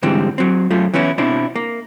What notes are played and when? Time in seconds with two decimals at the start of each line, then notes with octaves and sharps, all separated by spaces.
0.03 G#2 D3 E3 G3 C4
0.38 F#3 C4
0.70 F#2 A3 F4
0.94 E3 B3 C#4 E4
1.18 B2 C4 D4 E4
1.56 A#3